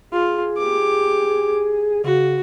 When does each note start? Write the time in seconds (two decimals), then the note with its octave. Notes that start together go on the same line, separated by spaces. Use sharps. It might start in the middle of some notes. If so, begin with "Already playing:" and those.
0.13 F4 G#4
0.58 G4 D6
2.04 C#3 F#4